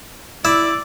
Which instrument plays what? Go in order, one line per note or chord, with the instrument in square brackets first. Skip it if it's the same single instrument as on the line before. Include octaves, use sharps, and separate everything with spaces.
[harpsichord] E4 [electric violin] D5 [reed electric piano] E6